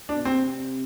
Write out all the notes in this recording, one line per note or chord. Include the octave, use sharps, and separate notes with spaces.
D4
B2
C3 C4